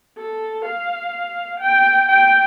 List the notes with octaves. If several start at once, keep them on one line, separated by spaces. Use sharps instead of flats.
A4
F5
G5
G5